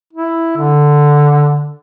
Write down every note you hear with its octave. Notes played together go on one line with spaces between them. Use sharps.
E4
D3